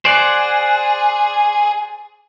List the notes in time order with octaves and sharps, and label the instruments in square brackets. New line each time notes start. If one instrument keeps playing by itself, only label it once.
[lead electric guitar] G#4 [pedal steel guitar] C5 D5 F#5